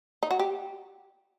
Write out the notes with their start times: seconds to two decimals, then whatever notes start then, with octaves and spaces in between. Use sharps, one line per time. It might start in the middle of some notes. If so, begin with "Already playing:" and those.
0.23 D#4
0.31 F#4
0.39 G4